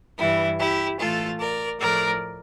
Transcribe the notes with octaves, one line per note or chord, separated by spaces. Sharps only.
G2 E3 G3 E4
E4 G4
A2 E3 A3 F4 A4
A#4 D5
A2 F3 A3 A#4 D5